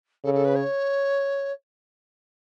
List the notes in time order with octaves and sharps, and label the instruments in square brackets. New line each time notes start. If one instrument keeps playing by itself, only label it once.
[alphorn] C#3 [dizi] A4
[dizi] A4
B4
C#5